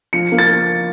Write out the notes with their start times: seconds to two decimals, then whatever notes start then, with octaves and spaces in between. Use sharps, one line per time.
0.13 F3 C#7
0.32 A#3
0.38 A6